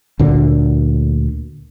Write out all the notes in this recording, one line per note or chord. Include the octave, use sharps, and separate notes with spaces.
D2 A#2 D3 A#3